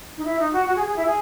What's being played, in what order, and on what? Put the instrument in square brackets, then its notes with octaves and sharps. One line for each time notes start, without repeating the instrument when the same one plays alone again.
[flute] D#4
E4
D#4
F#4
F#4
G#4
G#4
E4
G#4